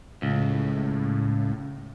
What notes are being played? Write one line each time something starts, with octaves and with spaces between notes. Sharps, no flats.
C#2 A2